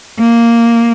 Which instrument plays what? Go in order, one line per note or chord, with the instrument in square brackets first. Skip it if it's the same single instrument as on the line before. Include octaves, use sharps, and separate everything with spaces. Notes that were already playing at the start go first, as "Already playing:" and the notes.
[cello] A#3